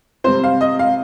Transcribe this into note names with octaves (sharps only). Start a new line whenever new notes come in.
C3 G3 C4 C5
F5
D#5
F5